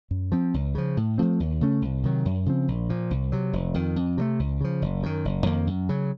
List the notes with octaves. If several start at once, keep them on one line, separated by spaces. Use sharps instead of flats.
F#2
F3 C4
C#2
C#3 F3
A2
F3 A3 C4
D#2
C#3 A3 C#4
C2
C3 D#3 F#3
F#2
C#3 F3 C4
A#1
A#2 F3
C2
C3 F#3
F1
F2 D#3
F2
C3 F#3 A3
C#2
C#3 F3
F#1
F#2 D#3
F#1
F2 D#3 A#3
F#2
C#3 F#3